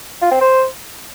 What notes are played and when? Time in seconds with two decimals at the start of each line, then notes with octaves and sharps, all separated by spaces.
0.22 F4
0.32 C4
0.41 C5